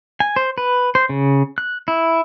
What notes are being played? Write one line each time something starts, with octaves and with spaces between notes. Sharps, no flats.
G#5
C5
B4
C5
C#3
F#6
E4